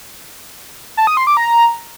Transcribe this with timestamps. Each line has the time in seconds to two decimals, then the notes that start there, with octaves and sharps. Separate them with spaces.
0.97 A5
1.07 D#6
1.17 C6
1.27 D6
1.37 A#5